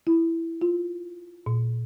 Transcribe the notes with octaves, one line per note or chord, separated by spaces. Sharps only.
E4
F4
A#2